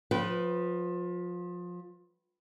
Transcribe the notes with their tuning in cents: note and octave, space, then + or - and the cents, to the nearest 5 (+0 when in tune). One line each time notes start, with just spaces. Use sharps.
F3 +25 B4 +0 G5 -30